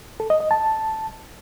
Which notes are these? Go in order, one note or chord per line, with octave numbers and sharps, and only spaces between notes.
A4
D#5
D#5
A5